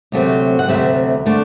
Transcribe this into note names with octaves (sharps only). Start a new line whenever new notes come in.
D2 C3 F#3 A3 C4
F#5
D2 C3 F#3 A3 C4 E5
D3 A3 D4